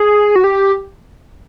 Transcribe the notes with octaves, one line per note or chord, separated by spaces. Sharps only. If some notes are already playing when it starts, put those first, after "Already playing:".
Already playing: G#4
F#4
G4